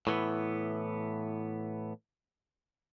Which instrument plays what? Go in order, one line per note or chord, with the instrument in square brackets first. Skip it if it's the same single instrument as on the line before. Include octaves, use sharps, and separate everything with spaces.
[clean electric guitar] A2 E3 B3